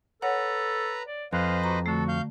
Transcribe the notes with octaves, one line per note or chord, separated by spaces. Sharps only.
A4 B4 C#5 F#5 A#5
D5
F2 B4 C5 D#5 F5 F#6
F#4 A#5
D3 A3 F#4 A4
F5 G6